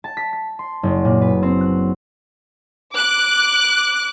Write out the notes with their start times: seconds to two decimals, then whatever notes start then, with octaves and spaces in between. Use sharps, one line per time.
0.04 A5
0.17 B6
0.33 B6
0.59 C6
0.83 F#1
1.05 A#2
1.22 B4
1.43 C4
1.61 F#6
2.94 D6 F#6